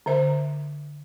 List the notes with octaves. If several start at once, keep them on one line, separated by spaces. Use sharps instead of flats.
D3 C5 E5